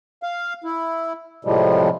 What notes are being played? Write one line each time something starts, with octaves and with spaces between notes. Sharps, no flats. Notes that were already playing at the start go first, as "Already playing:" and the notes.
F5
E4
A2 C3 F3 G3 G#3